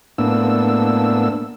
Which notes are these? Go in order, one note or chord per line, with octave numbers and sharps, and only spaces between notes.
A2 A#3 B3 D4 E6